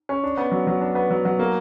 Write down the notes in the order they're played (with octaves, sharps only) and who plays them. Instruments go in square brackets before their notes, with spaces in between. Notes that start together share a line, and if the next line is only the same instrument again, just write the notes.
[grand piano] C#4
D4
B3
F#3
F#3
D4
B3
F#3
F#3
A#3